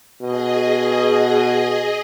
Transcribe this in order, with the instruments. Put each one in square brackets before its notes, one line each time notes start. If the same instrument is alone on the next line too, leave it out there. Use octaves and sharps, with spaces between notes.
[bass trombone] B2 [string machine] G#4 D#5